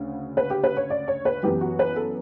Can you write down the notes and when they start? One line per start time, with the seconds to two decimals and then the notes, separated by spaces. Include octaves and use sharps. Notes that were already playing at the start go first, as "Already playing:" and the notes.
Already playing: D2 C#3
0.37 B4
0.50 G4
0.63 B4
0.77 C#5
0.90 D5
1.08 C#5
1.25 B4
1.43 F#2 E3 B3 G4
1.61 F#4
1.79 B4
1.96 A4